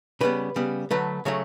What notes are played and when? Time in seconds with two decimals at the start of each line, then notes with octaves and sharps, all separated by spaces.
0.21 C#3 G3 B3 B4
0.56 C#3 G3 B3
0.91 D3 F#3 A3 B4
1.25 C#3 F#3 A3 C#5